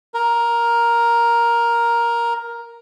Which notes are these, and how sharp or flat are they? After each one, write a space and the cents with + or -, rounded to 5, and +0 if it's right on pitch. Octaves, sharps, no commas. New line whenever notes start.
A#4 +10